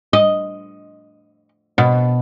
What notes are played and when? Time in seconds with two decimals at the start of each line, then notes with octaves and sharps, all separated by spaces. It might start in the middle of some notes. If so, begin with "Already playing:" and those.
0.13 D#5
1.78 B2